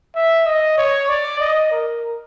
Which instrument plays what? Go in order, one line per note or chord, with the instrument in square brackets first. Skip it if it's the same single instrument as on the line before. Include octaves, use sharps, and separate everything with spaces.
[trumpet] E5
D#5
C#5
D5
D#5
A#4